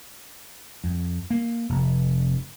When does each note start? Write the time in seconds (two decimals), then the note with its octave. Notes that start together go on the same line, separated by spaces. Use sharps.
0.84 F2
1.30 A#3
1.69 F1